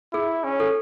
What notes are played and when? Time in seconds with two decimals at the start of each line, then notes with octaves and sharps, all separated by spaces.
0.13 E4 G#4
0.44 C#4
0.60 A4